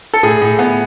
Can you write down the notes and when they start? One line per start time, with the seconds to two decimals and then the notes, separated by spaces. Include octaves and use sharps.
0.14 A4
0.23 A2 G#4
0.41 A2
0.59 B3